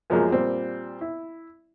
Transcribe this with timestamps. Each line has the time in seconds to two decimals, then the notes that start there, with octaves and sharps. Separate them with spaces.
0.10 F#2 F3 F#3 G#3 A#3
0.32 A#2 G3 C4
1.01 E4